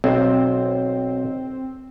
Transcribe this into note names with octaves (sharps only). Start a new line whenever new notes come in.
B1 C4